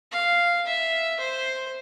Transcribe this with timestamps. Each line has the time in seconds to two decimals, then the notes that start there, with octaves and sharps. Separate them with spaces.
0.12 F5
0.67 E5
1.20 C5